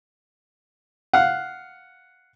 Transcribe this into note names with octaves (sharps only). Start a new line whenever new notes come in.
F5 F#5